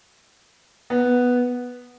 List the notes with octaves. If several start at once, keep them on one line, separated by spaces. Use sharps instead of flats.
B3